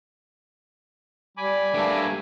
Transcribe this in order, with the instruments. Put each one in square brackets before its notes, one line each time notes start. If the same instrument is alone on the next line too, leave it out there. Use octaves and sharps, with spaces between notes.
[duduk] G3 [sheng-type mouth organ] G#5 B5 D6
[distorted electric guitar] G2 A#3 [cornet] A3